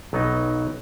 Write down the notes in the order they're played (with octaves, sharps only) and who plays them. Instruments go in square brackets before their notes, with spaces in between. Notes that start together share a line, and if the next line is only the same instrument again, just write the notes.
[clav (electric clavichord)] B1 F#3 B3 D#4 D#5